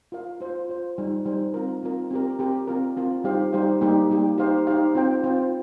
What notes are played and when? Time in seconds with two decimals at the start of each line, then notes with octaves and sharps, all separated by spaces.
0.12 F4 A#4 F5
0.41 F4 C5 F5
0.70 F4 C5 F5
0.98 G3 D#4 C5
1.26 G3 D#4 C5
1.54 C4 F4 A#4
1.83 C4 F4 A#4
2.11 C4 G4 A#4
2.39 C4 G4 A#4
2.67 C4 F4 A#4
2.96 C4 F4 A#4
3.24 G3 D#4 G4 C5 F5
3.53 G3 D#4 G4 C5 F5
3.81 G3 A#3 D#4 G4
4.10 G3 A#3 D#4 G4
4.38 D#4 G4 C5 F5
4.67 D#4 G4 C5 F5
4.95 C4 F4 C5 G5
5.24 C4 F4 C5 G5